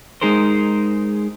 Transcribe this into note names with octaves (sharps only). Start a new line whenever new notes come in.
G#3 D#4 G#4 A#4 C5